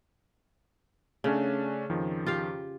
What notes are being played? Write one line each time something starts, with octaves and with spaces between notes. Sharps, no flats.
C#3 A3 C#4 D4
F2 D#3 F3
F4 G4 F5